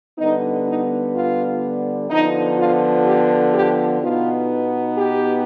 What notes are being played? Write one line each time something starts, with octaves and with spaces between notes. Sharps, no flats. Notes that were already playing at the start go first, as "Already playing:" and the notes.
D3 G3 B3 D#4
D#4
F4
D3 F3 B3 D#4
F4
G4
G4
B2 B3 D#4 F4
G4